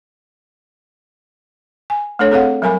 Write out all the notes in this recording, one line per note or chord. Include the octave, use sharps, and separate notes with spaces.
G#5
A3 D4 A4 C#5
C4 G#4 A4 C#5 F5 F#5
F#3 G3 A#4 G#5 B5